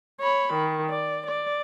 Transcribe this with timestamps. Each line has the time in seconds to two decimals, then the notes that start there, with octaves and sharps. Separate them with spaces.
0.21 C#5 B5
0.54 D#3
0.90 D5
1.27 D5